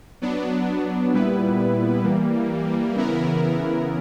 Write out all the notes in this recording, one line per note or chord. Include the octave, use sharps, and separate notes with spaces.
F#3 B3 D4
A#2 G3 B3 E4 B4
E3 G3 A#3
C#3 E3 B3 E4 A#4